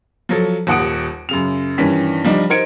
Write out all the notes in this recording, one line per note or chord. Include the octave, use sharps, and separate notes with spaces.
F3 F#3 A4
D#1 D#2 F#5 D#6 D7
F#2 C#3 F7
G2 D#3 E3 C#4 B6
F3 G3 D4 D#4
D#4 A#4 C5 G#6 C#7 D7